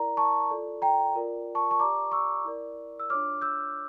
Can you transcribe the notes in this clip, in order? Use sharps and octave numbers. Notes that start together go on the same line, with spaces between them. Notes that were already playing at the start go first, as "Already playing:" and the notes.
Already playing: E4 A#4 D5 A#5
A5 C#6
F4 A4 D5
G5 A#5
F4 A#4 D5
A5 C#6
A5 C#6
G4 D5 A#5 D6
C#6 E6
E4 A#4 D5
E6
D4 F4 C#5 D6 F6
E6 G6